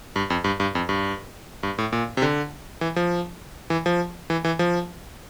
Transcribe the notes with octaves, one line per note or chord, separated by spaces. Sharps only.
G2
F2
G2
G2
F2
G2
G2
A2
A#2
C3
D3
E3
F3
E3
F3
E3
E3
F3